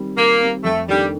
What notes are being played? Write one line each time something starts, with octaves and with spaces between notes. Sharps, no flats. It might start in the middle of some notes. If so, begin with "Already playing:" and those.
Already playing: D#3 G3 C4
D#3 A#3
G3 C4
F2 A3
D#3 G3 A3 D4 A4